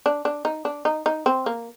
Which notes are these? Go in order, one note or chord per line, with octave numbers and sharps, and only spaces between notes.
D4
D4
D#4
D4
D#4
D#4
C4
A#3